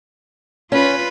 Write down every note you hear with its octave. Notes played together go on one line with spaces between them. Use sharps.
C#4 F4 B4